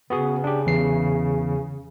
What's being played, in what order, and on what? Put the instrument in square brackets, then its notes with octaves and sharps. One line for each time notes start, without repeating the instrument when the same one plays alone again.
[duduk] C#3 [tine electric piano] B3 F#4 G#4
[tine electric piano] D4 G4
E2 E3 C7